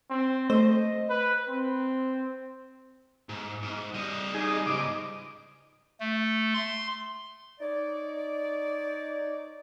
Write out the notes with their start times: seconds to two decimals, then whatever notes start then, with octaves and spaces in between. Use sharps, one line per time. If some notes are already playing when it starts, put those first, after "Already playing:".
0.10 C4
0.50 A3 C5 D#5
1.09 B4
1.48 C4
3.29 G#2
3.63 G#2
3.94 G3 D#5
4.34 D#4 G#4
4.67 C#2 G#2 D#5 D6
6.00 A3
6.54 C6
7.60 D#4 C#5 D5